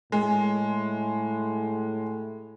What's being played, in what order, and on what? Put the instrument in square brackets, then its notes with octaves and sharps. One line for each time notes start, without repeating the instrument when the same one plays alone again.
[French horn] A2 [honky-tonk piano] G#3